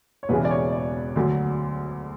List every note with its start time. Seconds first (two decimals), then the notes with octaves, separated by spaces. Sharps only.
0.23 C#5
0.29 E1 E2 C#3 E3 B4
0.45 D5
0.51 C#5
0.72 D5
1.16 D2 D3 F#3